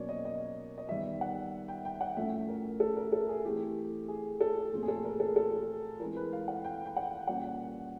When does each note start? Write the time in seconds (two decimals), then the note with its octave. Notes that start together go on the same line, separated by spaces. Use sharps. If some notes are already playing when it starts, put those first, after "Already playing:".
Already playing: B2 F#3 A#3 C#4 C#5 D5
0.09 D#5
0.25 D#5
0.78 D#5
0.89 D#3 G3 B3 E5
1.21 F#5
1.68 G5
1.85 G5
2.01 F#5
2.17 A2 F3 A3 C#4 E5
2.48 A#4
2.80 A4
2.97 A#4
3.12 A4
3.29 G#4
3.44 E3 A3 C4 G4
4.08 G#4
4.41 A4
4.73 A#2 F3 A3 C4
4.83 G#4
4.88 A4
5.05 A#4
5.20 A4
5.36 A4
6.00 E3 G#3 C4 A#4
6.16 B4
6.33 F5
6.48 F#5
6.64 G5
6.86 G5
6.96 F#5
7.28 A#2 G3 A#3 C#4 F#5